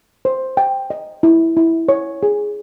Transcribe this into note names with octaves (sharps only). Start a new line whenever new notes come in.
C5
G5
D#5
E4
E4
C#5
G#4